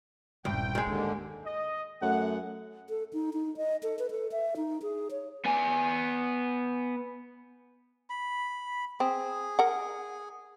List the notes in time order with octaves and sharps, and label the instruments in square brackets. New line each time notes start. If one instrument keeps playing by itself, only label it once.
[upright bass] D#1 G2 [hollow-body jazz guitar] C2 [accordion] G5
[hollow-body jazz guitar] G#2 G#3
[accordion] D#2 D3 [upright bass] D#4
[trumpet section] D#5
[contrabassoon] F#2 [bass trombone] A3 [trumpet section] F#5
[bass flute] A4
D#4
D#4
D#5
A4
B4
A4
E5
D#4
G#4
C#5
[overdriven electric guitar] B3 G#5
[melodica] B5
[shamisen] C4 [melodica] G#4
[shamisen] A#4 F#5